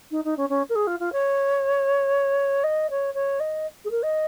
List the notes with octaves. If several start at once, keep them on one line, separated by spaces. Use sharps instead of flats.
D#4
D#4
C#4
C#4
A#4
G#4
F4
F4
C#5
D#5
C#5
C#5
D#5
G#4
A#4
D#5